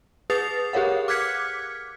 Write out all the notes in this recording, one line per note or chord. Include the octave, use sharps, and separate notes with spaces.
G#4 B4 D#6 A6 C7 F7
G4 G#4 A#4 C#5 F5 F#5
D6 F6 F#6 G#6 B6 C#7